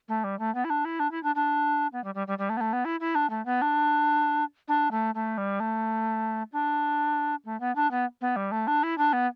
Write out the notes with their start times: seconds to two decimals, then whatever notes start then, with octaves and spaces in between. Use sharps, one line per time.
0.08 A3
0.24 G3
0.39 A3
0.55 B3
0.64 E4
0.70 D4
0.85 E4
1.00 D4
1.11 E4
1.23 D4
1.35 D4
1.92 B3
2.04 G3
2.15 G3
2.27 G3
2.38 G3
2.49 A3
2.57 B3
2.61 A3
2.73 B3
2.85 E4
3.00 E4
3.15 D4
3.30 A3
3.45 B3
3.62 D4
4.68 D4
4.91 A3
5.15 A3
5.38 G3
5.60 A3
6.52 D4
7.45 A3
7.60 B3
7.76 D4
7.91 B3
8.21 B3
8.36 G3
8.52 A3
8.67 D4
8.83 E4
8.98 D4
9.13 B3